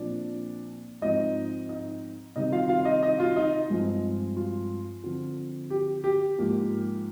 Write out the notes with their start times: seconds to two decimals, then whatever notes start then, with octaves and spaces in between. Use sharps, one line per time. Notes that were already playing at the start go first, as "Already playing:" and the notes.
Already playing: A#2 F3 C4 D4 D5
1.01 G#2 F3 G#3 C4 D#4 D#5
1.69 D#4 D#5
2.36 C3 D#3 G3 C4 D#4 D#5
2.52 F4 F5
2.69 F4 F5
2.85 D#4 D#5
3.03 D#4 D#5
3.19 F4 F5
3.36 D#4 D#5
3.70 G2 F3 G#3 C4
4.37 F4
5.04 D3 F3 C4
5.70 G4
6.04 G4
6.38 G#2 F3 A#3